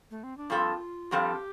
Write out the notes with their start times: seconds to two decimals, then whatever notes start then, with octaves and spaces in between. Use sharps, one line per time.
0.11 A3
0.24 C4
0.37 D4
0.50 G2 F3 C4 F4 A4
1.11 G2 F3 C4 G4 A4